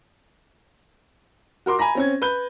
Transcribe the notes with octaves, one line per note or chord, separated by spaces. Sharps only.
F#4 A#4 C6 D6
G#5 A#5 B5 A#6
C4 C#4 G#6
B4 G6 G7